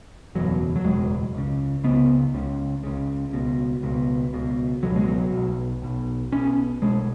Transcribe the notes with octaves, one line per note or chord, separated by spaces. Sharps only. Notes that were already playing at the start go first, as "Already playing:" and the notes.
F#1 E2 B2 F#3
F#3
F#1 E2 B2 G#3
C#2 C#3
C#2 C#3 B3
C#2 C#3
C#2 C#3
C#2 B2
C#2 B2
C#2 B2
C#2 B2 F#3
G#3
F#3
B1 B2
B1 B2
B1 B2 C#4
B1 B2 G#3